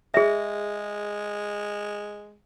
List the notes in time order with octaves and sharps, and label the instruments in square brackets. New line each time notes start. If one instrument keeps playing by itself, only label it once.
[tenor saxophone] G#3 [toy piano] G#4 E5